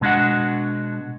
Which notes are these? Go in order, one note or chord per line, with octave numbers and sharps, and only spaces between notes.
B2 G#3 D4 F#4 F#5